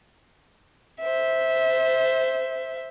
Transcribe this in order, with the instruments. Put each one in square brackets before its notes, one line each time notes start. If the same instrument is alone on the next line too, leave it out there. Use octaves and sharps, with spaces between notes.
[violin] C5 E5